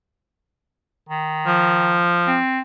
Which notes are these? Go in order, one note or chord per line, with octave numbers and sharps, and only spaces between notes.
D#3
F3
C4